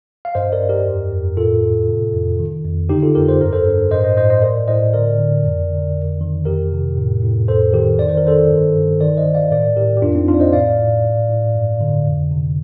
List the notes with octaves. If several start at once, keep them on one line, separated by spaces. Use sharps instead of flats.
F5
G2 C5 D#5
A#4 D5
G2
G4 A#4
F2
F2
A2 F4 A4
A2
C3
F2
D#3
F2
D3 D#4 G4
F4 A4
F2 G4 A#4
C5
G2 A#4
A4 C5
G2
A2 C5 D#5
C5 D#5
A2 C5 D#5
C5 D#5
A2 A#4 D5
A2 C5 D#5
D3 A#4 D5
D3
F2
D3
F2
D#3
F2 G4 A#4
C3
A2
A2
F2 A4 C5
D#3 G4 A#4
D#3 D5
C5
A#4
D#3 A4 C5
G2
G2
D#3 A#4 D5
C5 D#5
D#3
D5 F5
A2 A#4 D5
A2 G4 A#4
G4
F2 D4 F4
C4 D#4
F2 D4 F4
D5
C5 D#5
A2 D5 F5
A2
A2
A2
G2
D3
F2
C3